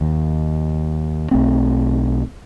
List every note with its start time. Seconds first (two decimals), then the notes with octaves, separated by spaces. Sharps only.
0.01 D#2
1.31 B1 A3 C4